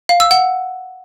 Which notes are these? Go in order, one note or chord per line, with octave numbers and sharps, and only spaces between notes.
F5
E6
F#5